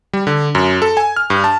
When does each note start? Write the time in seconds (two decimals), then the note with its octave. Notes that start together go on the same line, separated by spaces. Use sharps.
0.13 G3
0.27 D3
0.55 F#2
0.82 A4
0.97 G#5
1.16 F6
1.30 G2
1.44 A5